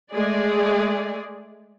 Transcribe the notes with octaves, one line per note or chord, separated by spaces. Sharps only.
G#3 A3 G#4 D5